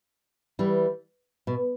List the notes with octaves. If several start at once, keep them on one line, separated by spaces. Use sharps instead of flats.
E3 G3
B2